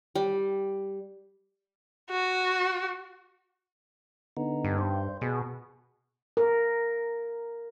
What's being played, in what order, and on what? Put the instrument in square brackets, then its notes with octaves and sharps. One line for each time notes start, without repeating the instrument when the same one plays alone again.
[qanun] G3
[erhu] F#4
[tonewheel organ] D3 B3 D#4
[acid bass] G2
[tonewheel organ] C5
[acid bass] B2 [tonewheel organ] G#4
[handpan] A#4